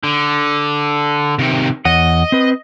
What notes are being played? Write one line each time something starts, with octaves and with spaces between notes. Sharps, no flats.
D3
C3 D#3
E2 C#5 D#5 F#5
C4 B4